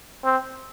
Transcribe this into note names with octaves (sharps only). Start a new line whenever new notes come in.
C4